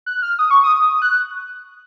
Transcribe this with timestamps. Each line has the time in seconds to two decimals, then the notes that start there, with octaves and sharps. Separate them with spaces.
0.06 F#6
0.22 F6
0.39 D#6
0.51 C#6
0.64 D#6
1.02 F#6